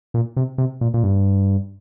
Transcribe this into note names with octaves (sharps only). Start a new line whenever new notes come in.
A#2
C3
C3
A#2
A#2
G2